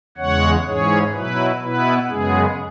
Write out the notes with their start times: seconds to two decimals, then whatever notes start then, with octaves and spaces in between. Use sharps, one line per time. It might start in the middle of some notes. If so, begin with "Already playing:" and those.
0.17 E2 C#3 G#3 C#5 F#5
0.65 G#2 E3 C#4 G#4 C#5
1.12 B2 F#3 E4 B4
1.60 B2 B3 E4 B4
2.08 F#2 C#3 G#3 B3 G#4